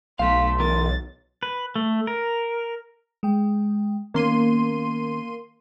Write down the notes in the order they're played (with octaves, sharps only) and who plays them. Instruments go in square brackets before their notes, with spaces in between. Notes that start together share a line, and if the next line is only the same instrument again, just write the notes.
[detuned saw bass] B1 [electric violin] A3 B6 [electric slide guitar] F5 [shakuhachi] C6
[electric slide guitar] E2 E3 A#4 [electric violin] A6
[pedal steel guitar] B4
A3
A#4
[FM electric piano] G#3 G5
[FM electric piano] D#3 B3 C#4 [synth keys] A#3 C6 D#7